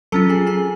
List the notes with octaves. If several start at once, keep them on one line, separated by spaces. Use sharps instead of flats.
F#3 C#4 F4 A4 A5
G#4 G#5
G#4 G#5